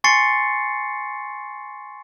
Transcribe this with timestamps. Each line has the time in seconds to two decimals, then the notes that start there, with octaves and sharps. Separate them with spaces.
0.04 G#5 C6 C#6 A6 C7 C#7